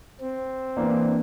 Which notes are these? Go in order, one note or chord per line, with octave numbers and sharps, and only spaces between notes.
C4
E3 A#3 D4